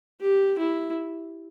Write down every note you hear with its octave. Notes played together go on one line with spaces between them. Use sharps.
G4
E4